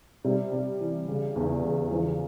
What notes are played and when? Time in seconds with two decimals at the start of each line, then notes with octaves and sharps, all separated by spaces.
0.24 C3 G3
0.52 C3
0.80 E3
1.08 C#3
1.36 E2
1.62 C#3
1.91 E3 F3